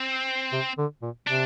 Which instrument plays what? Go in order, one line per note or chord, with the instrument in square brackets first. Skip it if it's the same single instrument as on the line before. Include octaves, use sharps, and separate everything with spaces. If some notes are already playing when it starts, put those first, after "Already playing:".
Already playing: [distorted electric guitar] C4
[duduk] C3
D3
A#2
[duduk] C3 [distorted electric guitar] D4